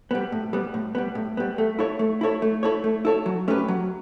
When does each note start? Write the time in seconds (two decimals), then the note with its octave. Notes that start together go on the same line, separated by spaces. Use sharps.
0.11 G3 B3
0.32 A2
0.53 G3 B3
0.74 A2
0.95 G3 B3
1.15 A2
1.37 G3 B3
1.58 A3
1.79 E4 A4 C#5
1.99 A3
2.21 E4 A4 C#5
2.42 A3
2.63 E4 A4 C#5
2.84 A3
3.05 E4 A4 C#5
3.26 F#3
3.48 A3 C#4 G4 B4
3.68 F#3